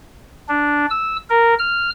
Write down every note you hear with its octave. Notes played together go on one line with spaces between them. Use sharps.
D4
E6
A#4
F6